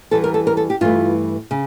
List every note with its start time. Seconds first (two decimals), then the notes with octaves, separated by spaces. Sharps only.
0.11 E2 E3 G3 A4
0.24 A#4
0.34 A4
0.47 A#4
0.57 A4
0.70 G4
0.81 G2 E3 A3 F4
1.51 C#3